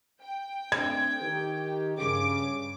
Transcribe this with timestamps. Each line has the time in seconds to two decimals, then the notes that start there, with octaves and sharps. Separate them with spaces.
0.22 G5
0.72 A3 C4 D4 G#6
1.22 D#3 G4
1.97 G2 C#3 C#4 D6